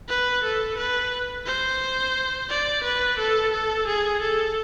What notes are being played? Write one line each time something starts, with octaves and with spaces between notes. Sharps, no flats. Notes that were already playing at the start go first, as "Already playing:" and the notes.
B4
A4
B4
C5
D5
B4
A4
A4
G#4
A4